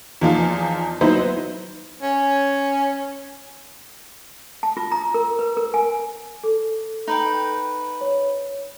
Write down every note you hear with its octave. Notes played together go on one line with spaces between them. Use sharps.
E2 F3 D#4 F4
F#3 B3 D#4 E4 B4 C5
C#4
A5
F4
A#5
A#4
B4
A#4
G#5
A4
D#4 B4 G5
C#5